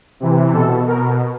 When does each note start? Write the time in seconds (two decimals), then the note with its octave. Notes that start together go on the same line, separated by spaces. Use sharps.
0.20 C3 E3
0.53 B2 A4
0.87 B2 A#4